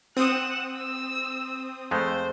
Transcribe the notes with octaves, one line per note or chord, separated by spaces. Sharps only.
C4 F#5 D#6 E7
E6
F2 G#3 A3 C5